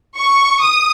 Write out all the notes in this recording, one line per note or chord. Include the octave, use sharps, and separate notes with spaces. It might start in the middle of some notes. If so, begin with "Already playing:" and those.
C#6
D#6